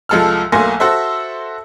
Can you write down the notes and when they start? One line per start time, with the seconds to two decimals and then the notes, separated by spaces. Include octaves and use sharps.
0.09 C2 F3 G#3 A4 E6 F6
0.52 B1 A3 A#3 G#5 C6 A#6
0.80 F#4 A4 C5 E5